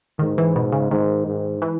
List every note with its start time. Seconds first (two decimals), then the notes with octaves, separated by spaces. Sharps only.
0.19 G#2 D#3
0.38 E3
0.56 B2
0.72 C#3
0.91 G#2 D#3
1.27 G#2
1.62 E3